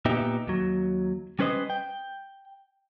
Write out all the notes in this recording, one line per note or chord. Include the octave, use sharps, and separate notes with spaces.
A#2 B3 D#4 G4 E5
D#2 F#3
G3 C#4 B4 C5 D#5
G5